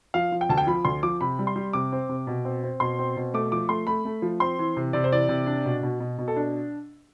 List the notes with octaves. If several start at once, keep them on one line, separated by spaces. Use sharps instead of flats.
F3 F5
F3
G5
D2 A5
G5
F3 B5
D2 C6
F3 D6
C3 B5
G3
C6
G3
C3 D6
C4
C3
B2
C4
C4
B2 C6
C4
B2
A3 D6
F3 D6
A3 C6
A3 B5
A3
F3
C4 C6
E3
C3
C3 D5
C5
E3 D5
C3
D4
B2
B2
B2
B2
A4
D4